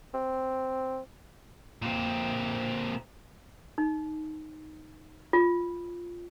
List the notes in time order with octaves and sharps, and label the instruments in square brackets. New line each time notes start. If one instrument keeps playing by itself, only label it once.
[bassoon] C4
[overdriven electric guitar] A#2 C4
[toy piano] D#4
F4